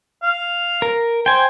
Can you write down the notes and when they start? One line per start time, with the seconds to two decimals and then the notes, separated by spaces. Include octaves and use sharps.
0.23 F5
0.82 A#4
1.26 C5 G5 G#5